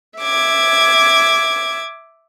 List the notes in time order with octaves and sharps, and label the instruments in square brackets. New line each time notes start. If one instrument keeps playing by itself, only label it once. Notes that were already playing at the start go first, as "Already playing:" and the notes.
[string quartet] E5 D6 G#6